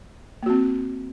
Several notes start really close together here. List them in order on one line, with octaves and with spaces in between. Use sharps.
A#3 F#4 C4